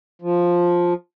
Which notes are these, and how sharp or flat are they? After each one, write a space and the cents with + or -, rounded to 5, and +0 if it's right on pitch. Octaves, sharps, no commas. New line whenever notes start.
F3 +5